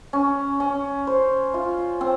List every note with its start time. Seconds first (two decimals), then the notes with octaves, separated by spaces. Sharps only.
0.13 C#4
0.60 C#4
1.07 C5
1.54 F4
2.01 C4